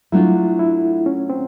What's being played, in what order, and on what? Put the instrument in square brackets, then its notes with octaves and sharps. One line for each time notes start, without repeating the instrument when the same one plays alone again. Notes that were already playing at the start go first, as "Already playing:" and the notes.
[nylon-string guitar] F#3 A3 D4 F4 [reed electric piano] E4
[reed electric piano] E4
C#4
C4